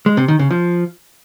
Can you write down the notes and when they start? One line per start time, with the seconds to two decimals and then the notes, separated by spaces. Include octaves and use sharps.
0.06 G#3
0.17 C3
0.28 D#3
0.39 C#3
0.51 F3